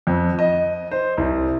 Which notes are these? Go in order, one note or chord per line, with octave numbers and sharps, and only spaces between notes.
F2
D#5
C5
C2